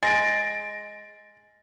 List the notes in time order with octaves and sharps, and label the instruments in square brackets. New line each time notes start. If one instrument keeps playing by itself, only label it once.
[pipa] G#3 [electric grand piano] A6 A#6 D7